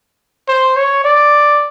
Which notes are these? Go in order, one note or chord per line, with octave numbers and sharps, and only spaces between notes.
C5
C#5
D5